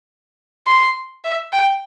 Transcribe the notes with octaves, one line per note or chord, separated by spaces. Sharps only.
C6
E5
G5